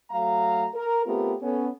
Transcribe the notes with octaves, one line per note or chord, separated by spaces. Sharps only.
F#3 A3 F5 A#5
A#4
A3 B3 C4 F4 G4 A#4
B3 C#4 A4